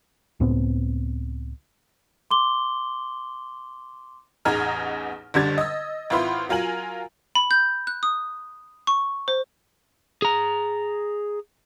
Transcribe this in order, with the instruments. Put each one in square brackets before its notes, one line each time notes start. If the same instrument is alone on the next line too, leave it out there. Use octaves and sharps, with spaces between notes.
[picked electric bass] C#2 A2 B3 C4
[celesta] C6 D6 G7
[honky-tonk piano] A1 E2 D#4 G#4 A#5 F6
F#1 D3 G3 G#6 A6
D#5 E6
G#1 E4 F4 B4 C6
F#3 F4 A#4 G#5 F#7
[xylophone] B5
G6
F#6
D#6
C#6
C5
[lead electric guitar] G#4 A#5